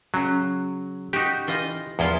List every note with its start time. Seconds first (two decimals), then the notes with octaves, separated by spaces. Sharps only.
0.14 C#3 F#3
1.13 D#4 F#4 G4
1.47 E3 F4 D#5
1.99 E2 F3 E4 F4